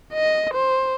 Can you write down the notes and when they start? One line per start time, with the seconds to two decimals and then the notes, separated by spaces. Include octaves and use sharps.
0.13 D#5
0.54 C5